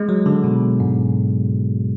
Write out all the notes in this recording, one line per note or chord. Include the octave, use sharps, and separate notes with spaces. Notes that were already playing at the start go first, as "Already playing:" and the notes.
Already playing: G#3
F#3
D3
B2
G#2